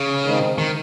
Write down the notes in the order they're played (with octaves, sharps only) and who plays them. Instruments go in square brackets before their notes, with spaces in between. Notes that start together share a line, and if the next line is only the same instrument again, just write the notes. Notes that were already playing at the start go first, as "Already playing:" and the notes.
Already playing: [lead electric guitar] C#3
[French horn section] D#3 G#3 C4 D#4
[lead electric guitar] D#3